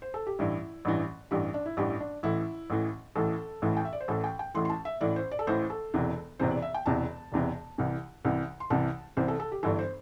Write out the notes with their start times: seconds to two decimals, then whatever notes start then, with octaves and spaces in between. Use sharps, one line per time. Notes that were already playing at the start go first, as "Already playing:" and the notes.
0.02 C5
0.14 A4
0.27 G4
0.39 A1 G2 E3 E4
0.85 A1 G2 E3
1.31 A1 G2 E3 G4
1.54 D4
1.66 E4
1.77 A1 G2 E3 G4
2.00 D4
2.23 A1 A2 E3 E4
2.70 A1 A2 E3
3.15 A1 A2 E3 A4
3.62 A1 A2 E3
3.77 G5
3.85 E5
3.93 D5
4.01 C5
4.08 A1 A2 E3 A4
4.24 G5
4.39 G5
4.54 A1 A2 E3 C6
4.65 C6
4.70 A5
4.85 E5
5.01 A1 A2 E3 D5
5.16 C5
5.31 D5
5.39 A4
5.47 A1 A2 E3 C5
5.70 A4
5.94 E1 E2 C3 E3
6.39 E1 E2 C3 E3 C5
6.51 D5
6.62 E5
6.74 G5
6.86 E1 E2 C3 E3 A5
7.32 E1 E2 C3 E3
7.78 C2 C3 E3
8.25 C2 C3 E3
8.60 C6
8.70 C2 C3 E3 A5
9.17 C2 C3 E3 C5
9.28 A4
9.40 A4
9.52 G4
9.63 G1 G2 E3 A4
9.79 C5